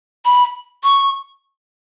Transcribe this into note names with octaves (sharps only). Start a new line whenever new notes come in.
B5
C#6